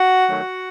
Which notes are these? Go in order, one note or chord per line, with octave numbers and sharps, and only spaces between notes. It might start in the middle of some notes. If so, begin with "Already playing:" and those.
Already playing: F#4 F#5
D#3 F#3 A3